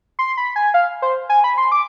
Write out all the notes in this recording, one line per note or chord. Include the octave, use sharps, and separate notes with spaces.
C6
B5
G#5
F5
C5
G#5
B5
C6
D6